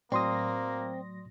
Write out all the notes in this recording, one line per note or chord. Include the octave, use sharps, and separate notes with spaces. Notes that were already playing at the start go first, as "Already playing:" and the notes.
A2 F#3 A#3 C4 D5 C6 D#6 A#6